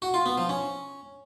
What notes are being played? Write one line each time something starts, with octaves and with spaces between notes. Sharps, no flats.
F#4
F4
B3
F3
C#4